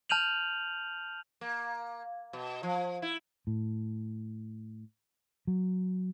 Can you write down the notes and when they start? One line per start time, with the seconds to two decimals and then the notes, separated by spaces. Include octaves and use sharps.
0.09 A5 F6 G6 D#7 F7 F#7
1.41 A#3
2.33 B2
2.63 F3
3.02 E4
3.47 A2
5.47 F#3